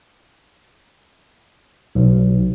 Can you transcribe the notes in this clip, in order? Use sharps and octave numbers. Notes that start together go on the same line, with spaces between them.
B1